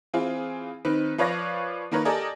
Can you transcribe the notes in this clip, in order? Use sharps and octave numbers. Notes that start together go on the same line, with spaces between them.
E3 C4 F4 G#4
D#3 C4 D#4 B4
F3 B4 C#5 D5 F5 A#6
D#3 A#3 D#4 A#4 B4 C#5
G4 A4 A#4 D5 D#5 G#5